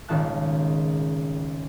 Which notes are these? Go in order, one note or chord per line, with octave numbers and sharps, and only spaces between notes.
D#1 G#1 C#2 D#3 A5 F#6